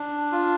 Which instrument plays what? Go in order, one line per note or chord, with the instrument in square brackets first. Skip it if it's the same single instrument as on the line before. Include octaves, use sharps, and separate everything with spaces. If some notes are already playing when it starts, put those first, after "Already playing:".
Already playing: [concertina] D4
F4